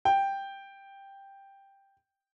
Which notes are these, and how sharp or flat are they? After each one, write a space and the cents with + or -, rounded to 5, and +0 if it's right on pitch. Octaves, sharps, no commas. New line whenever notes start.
G5 +5